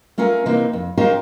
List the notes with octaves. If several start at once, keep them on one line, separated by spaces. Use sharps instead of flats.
A3 C#4 F4 A#4 G#5
C3 E3 A#3 C4 D#4
F2
C#4 D#4 F4 G4 A#4 C5